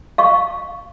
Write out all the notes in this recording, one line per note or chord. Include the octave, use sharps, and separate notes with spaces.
F5 C#6